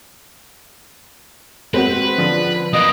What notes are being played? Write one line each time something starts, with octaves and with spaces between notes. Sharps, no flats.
G#3 C4 F#4 B4
D3 F3
A#3 B4 D#5